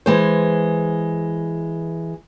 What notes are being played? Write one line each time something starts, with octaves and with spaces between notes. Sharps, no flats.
E3 G#3 C5